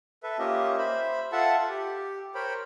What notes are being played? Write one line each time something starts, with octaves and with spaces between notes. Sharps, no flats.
A4 B4 E5
A#3 C#4 F4 G4 D#5 E5
C5 E5 B5
F4 A4 E5 F#5 A5
G4
A#4 C5 C#5 G5 B5